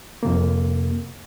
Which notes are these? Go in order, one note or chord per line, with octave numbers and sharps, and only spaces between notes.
F2 C3 A#3